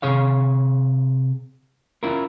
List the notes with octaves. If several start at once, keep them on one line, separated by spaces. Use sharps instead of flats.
C3 G#4 C#5 F5
C#4 E4 F4 A#4